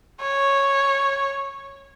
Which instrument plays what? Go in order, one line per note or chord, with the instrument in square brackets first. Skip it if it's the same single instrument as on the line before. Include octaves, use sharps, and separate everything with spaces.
[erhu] C#5